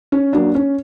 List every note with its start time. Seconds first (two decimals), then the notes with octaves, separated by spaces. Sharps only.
0.12 C#4
0.33 F#3 A#3 D4
0.55 C#4